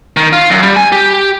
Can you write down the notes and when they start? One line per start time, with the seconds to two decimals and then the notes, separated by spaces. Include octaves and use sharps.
0.17 D#3
0.33 F4
0.50 F#2
0.62 G3
0.76 G#5
0.92 G4